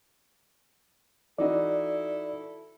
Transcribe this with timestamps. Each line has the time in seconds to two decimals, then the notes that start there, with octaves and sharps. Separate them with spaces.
1.38 E3 D#4 E4 F#4 A4 D5